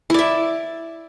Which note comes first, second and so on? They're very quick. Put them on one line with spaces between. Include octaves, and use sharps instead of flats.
E4 D5 E5